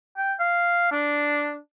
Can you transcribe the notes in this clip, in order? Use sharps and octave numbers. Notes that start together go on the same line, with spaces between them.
G5
F5
D4